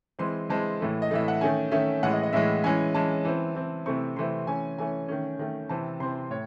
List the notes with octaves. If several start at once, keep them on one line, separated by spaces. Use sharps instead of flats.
E3 G#3 C4 C6
E3 G#3 C4 A5
A2 E3 A3
D#5
A2 E3 A3 E5
F#5
D#3 A3 C#4 G#5
D#3 A3 C#4 E5
A2 E3 G#3 F#5
D#5
D#5
A2 E3 G#3 E5
E3 G#3 C#4 G#5
E3 G#3 C#4 A5
E3 C4
E3 C4
C3 E3 A3 C4 C#6
C3 E3 A3 C4 C6
E3 A3 C#4 G#5
E3 A3 C#4 G#5
D#3 A3 C#4
D#3 A3 C#4
C3 E3 C4 A5
C3 E3 C4 C6
A2 C#5